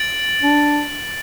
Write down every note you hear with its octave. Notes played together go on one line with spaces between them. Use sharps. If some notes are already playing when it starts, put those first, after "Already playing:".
Already playing: A6 D7 F#7
D4